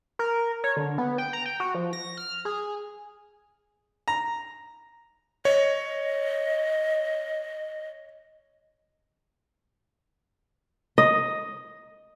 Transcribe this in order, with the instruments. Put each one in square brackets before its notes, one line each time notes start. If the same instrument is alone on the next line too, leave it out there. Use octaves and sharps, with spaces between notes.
[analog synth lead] A#4
C#5
D3
B3
G5
A#5
G5
F#4
F3
A#6
F6
G#4
[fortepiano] A#5
[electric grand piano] C#5 [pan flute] D#5
[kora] D#5